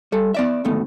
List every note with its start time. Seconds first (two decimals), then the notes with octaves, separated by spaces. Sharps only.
0.12 G3 A4
0.34 B3 D5 E5
0.65 D2 G#2 D#3 A3 B3